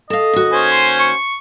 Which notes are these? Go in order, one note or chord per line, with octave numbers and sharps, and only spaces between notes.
A4 D#5 F5
D#2 F#4
C#4 C5 G#5
C6
C#6